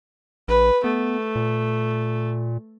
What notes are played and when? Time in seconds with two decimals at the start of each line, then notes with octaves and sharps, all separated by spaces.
0.48 A#1 B4
0.84 A3 B3
1.36 A#2